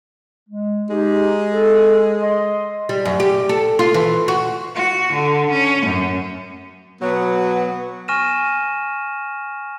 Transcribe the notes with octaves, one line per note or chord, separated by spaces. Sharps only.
G#3
G#3 D#4 G4
A4
D#5 C6
G3
F#2
G4
A4
F4
E3
F#4
F#4
D3
C#4
F#2
B2 F#3 B3
G#5 C#6 F6 A#6 D#7 E7